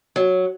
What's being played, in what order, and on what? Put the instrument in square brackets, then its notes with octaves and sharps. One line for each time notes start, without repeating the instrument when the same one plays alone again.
[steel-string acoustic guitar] F#3